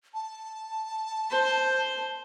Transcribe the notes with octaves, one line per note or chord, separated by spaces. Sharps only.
A5
C5